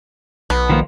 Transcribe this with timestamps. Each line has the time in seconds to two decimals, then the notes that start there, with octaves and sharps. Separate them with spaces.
0.50 B1 B3
0.70 D#3 F3 A#3